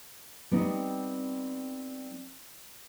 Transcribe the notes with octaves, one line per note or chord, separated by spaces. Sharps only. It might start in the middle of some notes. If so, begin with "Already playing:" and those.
G3 B3 C4 D#4